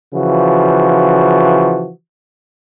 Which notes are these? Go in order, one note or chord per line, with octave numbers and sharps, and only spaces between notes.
C#3 E3 F3 F#4